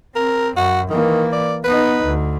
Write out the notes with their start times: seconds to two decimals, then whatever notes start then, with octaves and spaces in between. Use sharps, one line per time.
0.16 C4 A#4
0.57 F#2 F#4
0.90 D#3 E3 A#3
1.32 D5
1.64 B3 D#4 B4
2.05 D2